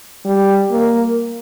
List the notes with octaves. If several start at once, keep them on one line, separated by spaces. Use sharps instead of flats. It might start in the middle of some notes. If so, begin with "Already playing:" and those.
G3
A#3